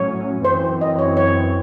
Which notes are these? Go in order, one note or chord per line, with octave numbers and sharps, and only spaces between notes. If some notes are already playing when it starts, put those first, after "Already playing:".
Already playing: A2 F#3 C#4 C#5
F#2 E3 C4 C5
D#5
C#5
C#5